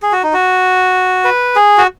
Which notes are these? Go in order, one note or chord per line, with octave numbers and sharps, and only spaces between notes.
G#4
F#4
D#4
F#4
B4
G#4
F#4